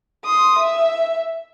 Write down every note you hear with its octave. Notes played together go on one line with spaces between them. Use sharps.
C6 D#6
E5